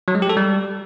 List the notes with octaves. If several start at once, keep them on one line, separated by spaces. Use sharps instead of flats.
F#3
G#3
G4
A4
G3